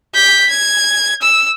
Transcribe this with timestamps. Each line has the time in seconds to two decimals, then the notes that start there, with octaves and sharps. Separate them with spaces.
0.14 G6 B6
0.50 G#6
1.22 E6